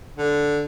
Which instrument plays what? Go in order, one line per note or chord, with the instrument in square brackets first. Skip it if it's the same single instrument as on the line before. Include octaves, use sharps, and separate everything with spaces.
[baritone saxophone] D3